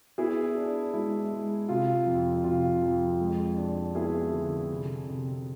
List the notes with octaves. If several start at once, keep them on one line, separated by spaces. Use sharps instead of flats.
B3 E4 G#4
D4
G#3 E4
G#3
C3 F4
F2
C3 F4
F2
G#3
D4
B3 E4 G#4
D3
C3
C3